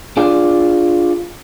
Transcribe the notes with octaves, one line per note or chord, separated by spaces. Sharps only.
D4 F4 G#4 D5